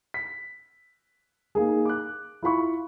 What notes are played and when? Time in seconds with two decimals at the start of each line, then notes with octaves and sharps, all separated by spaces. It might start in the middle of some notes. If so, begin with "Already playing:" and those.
0.14 B6
1.55 A#3 D#4 G#4
1.85 D6 F#6
2.43 E4 F4 B5 C#6